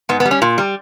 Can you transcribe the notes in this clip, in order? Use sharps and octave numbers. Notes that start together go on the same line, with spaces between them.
G#2 B3
B3
G3
C#4
A#2
G3